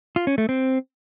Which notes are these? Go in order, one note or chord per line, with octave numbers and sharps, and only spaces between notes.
F4
C#4
A3
C4